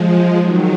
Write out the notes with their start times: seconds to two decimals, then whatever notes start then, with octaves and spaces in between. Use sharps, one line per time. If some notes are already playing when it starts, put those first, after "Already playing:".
Already playing: F3 G#3
0.37 D#3 F#3